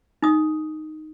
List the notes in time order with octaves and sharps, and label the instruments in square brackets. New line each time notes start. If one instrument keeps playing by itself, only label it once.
[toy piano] D#4 D#6